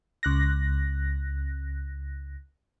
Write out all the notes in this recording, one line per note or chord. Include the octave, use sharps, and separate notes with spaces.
C#2 F#6 A#6